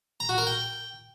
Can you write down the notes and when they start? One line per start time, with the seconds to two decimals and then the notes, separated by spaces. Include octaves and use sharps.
0.20 A#5
0.29 F#4
0.38 A#4
0.47 G5